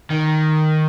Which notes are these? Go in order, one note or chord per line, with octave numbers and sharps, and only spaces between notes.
D#3